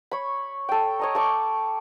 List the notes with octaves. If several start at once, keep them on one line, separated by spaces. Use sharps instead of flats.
C#5 B5
A4 G5
C#5 D#5 A#5
A4 C#6 D6